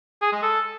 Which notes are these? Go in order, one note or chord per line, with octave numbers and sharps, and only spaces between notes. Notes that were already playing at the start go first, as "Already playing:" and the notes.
G#4
G#3
A4